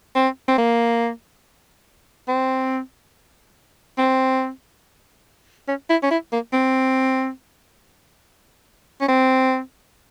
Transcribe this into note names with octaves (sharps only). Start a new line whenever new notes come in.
C4
C4
A#3
C4
C4
C#4
E4
C#4
E4
A#3
C4
C#4
C4